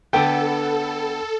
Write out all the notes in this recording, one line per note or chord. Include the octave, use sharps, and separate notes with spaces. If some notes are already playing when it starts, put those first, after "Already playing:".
D3 B3 A4 G5